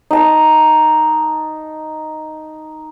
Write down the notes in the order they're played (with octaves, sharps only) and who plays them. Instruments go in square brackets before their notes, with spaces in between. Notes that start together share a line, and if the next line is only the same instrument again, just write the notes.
[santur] D#4 A5